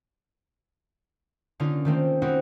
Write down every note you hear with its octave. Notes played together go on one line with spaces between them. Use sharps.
D3 A#3 C#4 D#4 F4
D#3 A3 A#3 C4
A#3 C4 C#4 D#4 E4 F#4